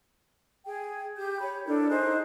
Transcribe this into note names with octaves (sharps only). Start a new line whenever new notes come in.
G#4 G5
G4 G6
C#5 B5
D4 E4 A4 A#4
D#4 G#4 C5 F#6